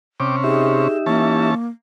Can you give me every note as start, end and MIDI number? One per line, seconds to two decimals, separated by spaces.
0.20 0.88 48
0.20 0.88 61
0.20 0.36 79
0.20 0.36 86
0.44 1.50 63
0.44 1.50 67
0.44 0.97 68
0.44 1.50 76
1.06 1.55 52
1.06 1.68 58
1.06 1.55 61
1.06 1.55 81